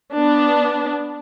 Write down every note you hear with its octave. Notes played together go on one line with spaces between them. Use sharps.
B3 D4